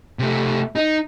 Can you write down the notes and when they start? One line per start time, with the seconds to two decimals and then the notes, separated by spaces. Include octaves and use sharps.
0.19 C3 A3
0.76 D#4